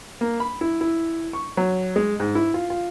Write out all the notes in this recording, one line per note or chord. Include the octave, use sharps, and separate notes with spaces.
A#3
B5
E4
E4
C#6
F#3
G#3
G#2
E4
F4
F4